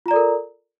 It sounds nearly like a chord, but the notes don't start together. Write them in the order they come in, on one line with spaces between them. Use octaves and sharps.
F4 A#5 D5 A4 A#4